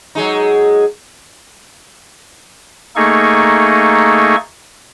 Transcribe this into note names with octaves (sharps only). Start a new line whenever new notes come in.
F#3 G#3 D#4
A3 A#3 D#4 G#4 A4 C#6